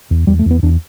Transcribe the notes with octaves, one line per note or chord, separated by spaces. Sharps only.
E2
E2 G3
A3
E2 B3
E2 D4